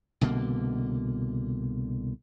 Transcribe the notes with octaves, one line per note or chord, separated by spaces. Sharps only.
C2 B2 D3 A#3